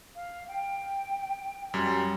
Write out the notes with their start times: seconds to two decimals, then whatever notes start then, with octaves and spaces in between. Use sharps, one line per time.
0.15 F5
0.48 G5
1.74 F#2 G3